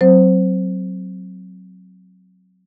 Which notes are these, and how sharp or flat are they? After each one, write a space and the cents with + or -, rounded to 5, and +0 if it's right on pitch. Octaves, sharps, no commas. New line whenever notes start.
F#3 +5 C4 +0 C5 +0